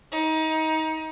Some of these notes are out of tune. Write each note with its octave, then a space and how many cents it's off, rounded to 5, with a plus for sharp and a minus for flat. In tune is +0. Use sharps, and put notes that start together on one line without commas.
D#4 +25